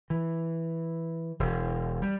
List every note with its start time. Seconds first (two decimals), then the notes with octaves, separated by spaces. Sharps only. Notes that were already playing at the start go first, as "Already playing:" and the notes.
0.10 E3
1.40 E1
2.02 G3